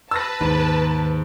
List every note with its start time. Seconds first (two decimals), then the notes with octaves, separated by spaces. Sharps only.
0.11 B4 A5 E6 A6 A#6
0.41 D#2 G#2